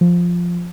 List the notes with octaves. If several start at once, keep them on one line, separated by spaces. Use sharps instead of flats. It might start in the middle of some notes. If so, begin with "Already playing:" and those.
F3